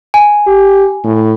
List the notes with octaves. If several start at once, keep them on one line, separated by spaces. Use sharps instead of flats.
G#5
G4
A2